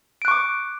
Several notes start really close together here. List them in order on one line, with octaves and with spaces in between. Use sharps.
D7 F#6 C#6 D6